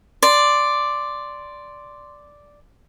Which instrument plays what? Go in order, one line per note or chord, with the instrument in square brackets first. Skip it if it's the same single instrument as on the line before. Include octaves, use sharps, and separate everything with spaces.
[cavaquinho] D5 [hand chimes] C6